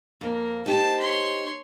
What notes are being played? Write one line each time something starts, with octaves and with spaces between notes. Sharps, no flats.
F2 A#3
D#4 G4 C5 A5
C#5 C6